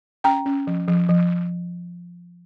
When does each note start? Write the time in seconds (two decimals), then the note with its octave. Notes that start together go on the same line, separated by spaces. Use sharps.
0.24 C#4 G5 A#5
0.46 C#4
0.67 F3
0.88 F3
1.09 F3